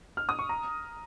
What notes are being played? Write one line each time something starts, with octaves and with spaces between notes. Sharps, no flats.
F6
D#6
C#6
A#5